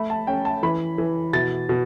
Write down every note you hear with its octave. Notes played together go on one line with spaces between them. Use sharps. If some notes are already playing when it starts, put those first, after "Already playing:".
Already playing: A3 B5
A5
C#4 G5
A5
E3 B5
E3
B2 A6
B2